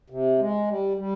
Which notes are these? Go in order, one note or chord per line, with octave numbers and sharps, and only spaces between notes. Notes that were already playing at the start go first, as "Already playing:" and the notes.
C3
G#3
G3
G3